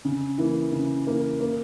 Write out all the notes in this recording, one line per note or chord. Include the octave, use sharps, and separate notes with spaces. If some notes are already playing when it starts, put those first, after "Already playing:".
C#3
E3 A#3
C#3
E3 A#3
A#3